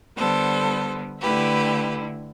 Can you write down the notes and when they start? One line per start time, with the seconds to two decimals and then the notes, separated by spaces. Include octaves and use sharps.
0.16 D3 G3 B3 A4 C5
1.20 D3 A3 E4 G4 B4